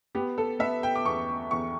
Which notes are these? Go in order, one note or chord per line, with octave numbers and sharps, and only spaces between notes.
B3 G4
A4
B3 E5
G5
D6
E2 C#6
E2 C#6